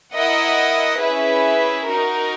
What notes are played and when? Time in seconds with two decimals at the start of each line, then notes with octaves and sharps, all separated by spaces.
0.13 E4 A#4 D#5 F#5
1.00 C#4 E4 G#4 B4 E5
1.86 D#4 F#4 A#4